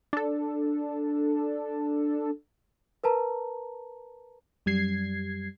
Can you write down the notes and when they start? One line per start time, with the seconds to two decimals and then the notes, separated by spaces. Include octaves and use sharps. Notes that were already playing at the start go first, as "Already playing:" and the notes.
0.13 D4 A4
3.04 A#4 B4 A5 A#5
4.66 F#2 G3 G#6 C7